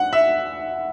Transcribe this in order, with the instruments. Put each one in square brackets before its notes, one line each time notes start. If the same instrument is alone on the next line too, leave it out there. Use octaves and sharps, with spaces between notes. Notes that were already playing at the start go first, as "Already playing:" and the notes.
Already playing: [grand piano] F#5
E5